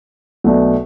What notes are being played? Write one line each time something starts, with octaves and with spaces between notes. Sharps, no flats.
B1 B2 A3 D4